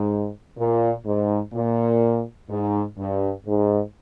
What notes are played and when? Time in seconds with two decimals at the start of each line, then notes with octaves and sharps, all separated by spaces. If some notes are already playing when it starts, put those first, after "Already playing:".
Already playing: G#2
0.57 A#2
1.05 G#2
1.53 A#2
2.49 G#2
2.97 G2
3.46 G#2